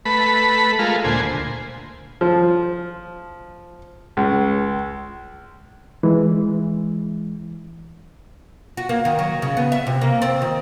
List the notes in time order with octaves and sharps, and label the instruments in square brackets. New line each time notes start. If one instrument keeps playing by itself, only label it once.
[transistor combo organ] A3 B4 B5
G#3 A3 F4 A#4
D2 A#2 C5 G#5
[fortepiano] F3
C#2
[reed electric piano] E3 G#3
[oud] F#4
A#3
D#3
F#3
C#3
B3
E5
C3
A#3
C4
D#3